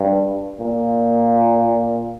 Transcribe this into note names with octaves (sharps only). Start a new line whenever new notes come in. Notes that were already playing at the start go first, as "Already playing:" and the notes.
Already playing: G2
A#2